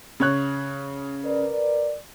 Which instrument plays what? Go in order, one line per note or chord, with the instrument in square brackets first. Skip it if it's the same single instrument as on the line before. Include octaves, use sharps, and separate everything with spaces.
[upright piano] C#3 C#5 F#6
[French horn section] A#4 B4 D5